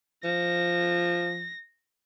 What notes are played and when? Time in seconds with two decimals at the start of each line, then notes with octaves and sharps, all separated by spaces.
0.24 F3 A#6